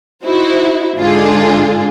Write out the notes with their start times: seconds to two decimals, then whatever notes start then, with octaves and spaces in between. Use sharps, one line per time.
0.24 D#4 E4 F#4 C5
0.97 G#2 D3 G#3 D4 F4 G#4